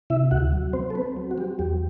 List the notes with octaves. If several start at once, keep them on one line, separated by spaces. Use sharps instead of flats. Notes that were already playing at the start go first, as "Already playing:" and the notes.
C3 E4 E5
D2 F#4 F#5
F#3
C4 C5
A4
B3 C4 B4
F#3
F#4
F#3 G4
E2 G4